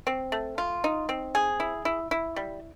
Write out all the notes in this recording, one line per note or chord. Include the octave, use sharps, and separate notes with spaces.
C4
A3
F4
D#4
C4
G#4
E4
E4
E4
G3